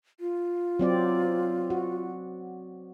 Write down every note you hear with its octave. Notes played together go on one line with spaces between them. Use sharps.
F4
F#3 C4 D5
F#4